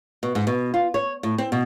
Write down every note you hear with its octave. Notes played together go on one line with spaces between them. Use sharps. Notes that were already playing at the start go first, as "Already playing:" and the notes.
B2
G#2
B2
F4
C#5
A2
C4
B2